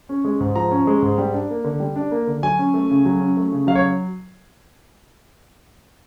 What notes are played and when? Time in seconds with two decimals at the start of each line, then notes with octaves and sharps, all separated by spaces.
0.09 C#4
0.24 G#3
0.40 G#2
0.55 F3 A#5
0.71 C#4
0.87 G#3
1.02 G#2
1.18 G3
1.34 D4
1.50 A#3
1.64 D3
1.80 G3
1.96 D4
2.11 A#3
2.27 D3
2.43 F#3 G#5
2.59 C#4
2.74 A3
2.90 C#3
3.05 F#3
3.21 C#4
3.37 A3
3.52 C#3
3.67 F#3 F5
3.75 C#5